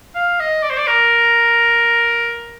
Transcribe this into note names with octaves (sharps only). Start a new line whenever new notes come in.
F5
D#5
D5
C5
D5
A#4